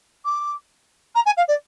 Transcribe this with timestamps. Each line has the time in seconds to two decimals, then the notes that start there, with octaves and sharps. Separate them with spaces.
0.25 D6
1.15 A#5
1.25 G#5
1.37 F5
1.48 D5